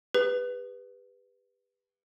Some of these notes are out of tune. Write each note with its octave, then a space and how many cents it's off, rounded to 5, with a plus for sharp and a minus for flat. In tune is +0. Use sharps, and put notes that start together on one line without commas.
G4 +40 B4 +0